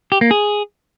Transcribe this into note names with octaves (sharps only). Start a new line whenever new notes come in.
G4
A#3
G#4